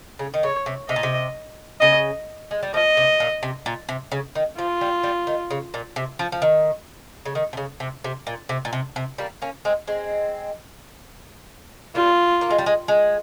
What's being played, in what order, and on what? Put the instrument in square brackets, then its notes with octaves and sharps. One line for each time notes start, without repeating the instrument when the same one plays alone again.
[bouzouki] C#3
D#3
[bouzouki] C#3 [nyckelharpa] C#5
[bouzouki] C3
[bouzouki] C3 [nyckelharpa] D#5
[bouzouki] A#2
C3
[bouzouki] C#3 [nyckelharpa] D#5
[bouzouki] G#3
G3
[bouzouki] F3 [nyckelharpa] D#5
[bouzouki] C3
A#2
C3
A#2
C3
C#3
D#3
[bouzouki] F3 [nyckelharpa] F4
[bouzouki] G3
G3
D#3
C#3
A#2
C3
F3
F3
D#3
C#3
D#3
C3
C#3
C3
C3
A#2
C3
A#2
C3
C3
G3 A#3
A#3 C#4
G#3 C4
G#3 C4
[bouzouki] G3 A#3 [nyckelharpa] F4
[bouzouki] A#3
G#3
G3
G#3
G#3